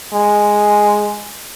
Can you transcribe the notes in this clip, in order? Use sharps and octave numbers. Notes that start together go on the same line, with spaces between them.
G#3